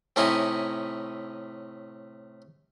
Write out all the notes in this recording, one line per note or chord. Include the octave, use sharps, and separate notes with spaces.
A2 C3 C#4 D#4 E4